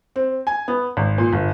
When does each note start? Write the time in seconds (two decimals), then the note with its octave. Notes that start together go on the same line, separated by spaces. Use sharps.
0.16 C4
0.47 G#5
0.68 B3
0.97 G#1
1.18 A#2
1.33 G1